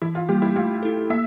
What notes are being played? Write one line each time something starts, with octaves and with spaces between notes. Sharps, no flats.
E3 E4
F4
G3 A#3 G4
E4
A3 F4
E4 A4
A#3 E5